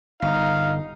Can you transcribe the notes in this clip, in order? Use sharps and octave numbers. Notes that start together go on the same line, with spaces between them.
G1 D#4 F5